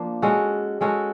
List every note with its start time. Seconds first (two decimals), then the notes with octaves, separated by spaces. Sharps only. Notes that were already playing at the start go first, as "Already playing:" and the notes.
Already playing: F3 A#3 D4
0.22 G#3 C#4 F#4 A4
0.81 G#3 C#4 F#4 A4